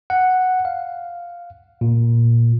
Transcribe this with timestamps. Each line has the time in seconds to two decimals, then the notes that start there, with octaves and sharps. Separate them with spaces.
0.10 F#5
0.65 F5
1.81 A#2